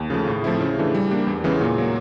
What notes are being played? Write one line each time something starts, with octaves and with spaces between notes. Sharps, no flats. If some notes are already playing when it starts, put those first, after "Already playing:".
Already playing: D#2
C#3 F3 A3
A2
F3 A3 C4 E4
C#3
E3 A3 D4 G4
G3
A#3 D4 G4
E2
C#3 E3 G#3 B3
A#2
F#3 A#3